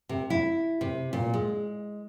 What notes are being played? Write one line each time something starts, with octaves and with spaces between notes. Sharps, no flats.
C3
E4
C3
A#2
G#3